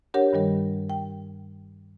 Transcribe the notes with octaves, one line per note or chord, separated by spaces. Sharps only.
D4 G4 A#4 C#5 F#5
G2 D#3 G3 A#4
G5